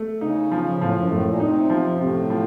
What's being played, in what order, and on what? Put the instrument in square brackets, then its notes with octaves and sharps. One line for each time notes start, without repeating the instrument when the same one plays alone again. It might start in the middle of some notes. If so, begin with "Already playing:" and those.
Already playing: [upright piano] A3
[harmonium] C#3 [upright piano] D#4
[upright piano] F3
[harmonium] A2 [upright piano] F3
[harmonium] F#2
[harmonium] A2 [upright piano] A3
[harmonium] A#2
[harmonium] C3 [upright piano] D#4
[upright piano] F3
[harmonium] F#2
[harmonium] A2 [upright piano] C3
[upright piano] F3